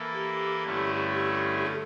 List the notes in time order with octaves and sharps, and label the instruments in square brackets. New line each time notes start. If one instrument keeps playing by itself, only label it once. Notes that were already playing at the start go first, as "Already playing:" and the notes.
Already playing: [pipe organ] E3 A#3 E4 A4
[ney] G4
[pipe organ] G2 D3 A3 C#4 E4
[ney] G4
G4
A4